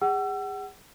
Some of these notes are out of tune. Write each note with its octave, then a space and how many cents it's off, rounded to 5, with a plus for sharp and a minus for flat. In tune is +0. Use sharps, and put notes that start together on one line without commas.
G#4 -35 F#5 +30 E6 +35